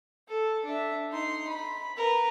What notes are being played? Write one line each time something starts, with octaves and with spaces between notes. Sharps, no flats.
A4
D4 E5
D#4 C6
B5
A#4 B4